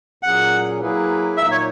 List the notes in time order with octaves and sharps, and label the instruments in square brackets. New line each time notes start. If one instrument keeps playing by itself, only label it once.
[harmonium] A#2 F#3 C#4 G#4 [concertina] F#5
[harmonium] F#3 A#3 E4 G#4 B4
[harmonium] A#2 F#3 A#3 D#4 [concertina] E5
[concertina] C#5